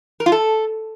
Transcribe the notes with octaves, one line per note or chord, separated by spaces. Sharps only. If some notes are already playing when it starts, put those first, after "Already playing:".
A#4
F4
A4